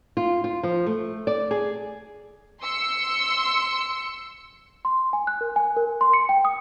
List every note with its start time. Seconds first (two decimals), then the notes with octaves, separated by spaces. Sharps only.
0.17 F4
0.44 F4
0.63 F3
0.86 A3
1.27 D5
1.51 G#4
2.61 C6 E6 C#7
4.85 C6
5.13 G#5
5.27 F#6
5.41 A#4
5.56 G#5
5.77 A#4
6.01 C6
6.13 C#7
6.29 G5
6.45 D#6